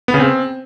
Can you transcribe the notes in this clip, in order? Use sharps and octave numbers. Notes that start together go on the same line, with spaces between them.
B3
C#3
C4